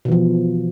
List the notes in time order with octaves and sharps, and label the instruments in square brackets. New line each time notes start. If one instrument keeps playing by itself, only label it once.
[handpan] B2
E3
F3